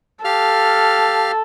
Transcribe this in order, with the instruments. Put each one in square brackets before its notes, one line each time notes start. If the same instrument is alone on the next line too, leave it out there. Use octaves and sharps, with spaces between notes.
[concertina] G4 F5 F6 [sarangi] A4